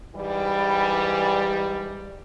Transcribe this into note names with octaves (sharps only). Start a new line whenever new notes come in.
G#2 E3 G3